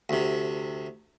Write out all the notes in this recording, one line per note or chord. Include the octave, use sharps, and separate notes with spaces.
D2 C3